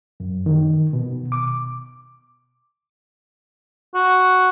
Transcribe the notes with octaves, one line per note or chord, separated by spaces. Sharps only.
F#2
D#3
B2
D6
F#4